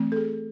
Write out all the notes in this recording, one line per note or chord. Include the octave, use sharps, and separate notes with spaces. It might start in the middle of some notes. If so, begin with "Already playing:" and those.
Already playing: E3 A3 C4
A4
G#4